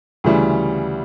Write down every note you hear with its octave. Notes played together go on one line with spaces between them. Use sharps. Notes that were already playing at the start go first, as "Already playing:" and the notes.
D2 C#3 E3 G3